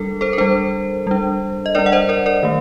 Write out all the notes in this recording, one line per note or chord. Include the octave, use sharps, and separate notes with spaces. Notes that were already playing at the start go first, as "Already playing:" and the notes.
Already playing: G3 D4 A4 A#4
A4 C5
A#4
G3 D4 A4 C5
G3 D4
D#5
G3 D4 A#4 D5
F#5
C5 D#5
A#4 D5
A#4 D5
D#3 A3